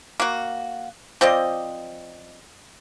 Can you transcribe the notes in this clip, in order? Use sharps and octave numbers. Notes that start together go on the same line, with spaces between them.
A#3 F#4
F3 C4 D5 D#5